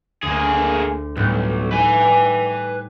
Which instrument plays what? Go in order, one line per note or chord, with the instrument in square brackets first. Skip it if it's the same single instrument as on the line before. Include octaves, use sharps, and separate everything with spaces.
[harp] D2 [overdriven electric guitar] A#3 G#4
[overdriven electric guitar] B1 [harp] A2 G3
[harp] D#4 [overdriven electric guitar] B4 G#5
[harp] D5 G5